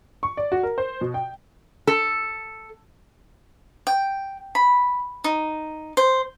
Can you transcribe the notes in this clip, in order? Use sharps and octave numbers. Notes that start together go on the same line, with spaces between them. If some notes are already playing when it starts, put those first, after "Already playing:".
C#6
D5
F#4
A#4
C5
B2
G5
A4
G5
B5
D#4
C5